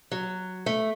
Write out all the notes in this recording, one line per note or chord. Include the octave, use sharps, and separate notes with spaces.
F#3
A3